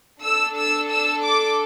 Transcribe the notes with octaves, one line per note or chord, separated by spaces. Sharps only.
D4 A4 E6
E6
E6
D6